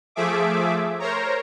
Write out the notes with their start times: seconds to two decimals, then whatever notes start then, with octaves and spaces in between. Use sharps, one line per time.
0.15 F3 A3 G#4 E5 D6
0.99 A#4 C5 C#5 A#5